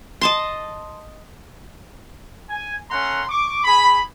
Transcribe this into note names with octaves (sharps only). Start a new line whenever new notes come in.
D#5 A5 C6
G#5
A3 C#4 F#5 A#5 C6
C#6 D6
G#4 B5